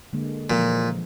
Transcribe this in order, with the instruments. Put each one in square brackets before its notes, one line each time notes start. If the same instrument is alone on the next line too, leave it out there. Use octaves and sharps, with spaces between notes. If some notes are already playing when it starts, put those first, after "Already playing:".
[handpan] D3 G#3 A#3
[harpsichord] A#2 [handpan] E3 F3 G#3